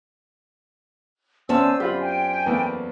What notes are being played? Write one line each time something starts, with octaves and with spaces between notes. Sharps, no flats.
E2 C#4 C5 D5 G#5 A5 E6
F#2 F4 G4 B5
G5 G#5
E2 A3 A#3 B4